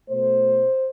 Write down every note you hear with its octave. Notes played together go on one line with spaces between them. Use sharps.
B2 A3 C5